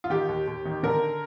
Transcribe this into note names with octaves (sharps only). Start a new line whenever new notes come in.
F4
D#3 G4
D#2
D#2
D#3
D3 A#4